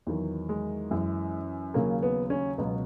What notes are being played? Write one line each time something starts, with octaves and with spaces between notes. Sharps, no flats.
E2 D#3 F#3
G#3
F#2 E3
D#2 C#3 F#3 A#3
B3
C#4
C#2 B2 F#3 B3